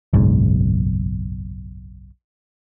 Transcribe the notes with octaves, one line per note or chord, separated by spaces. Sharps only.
F#1 B1 G#2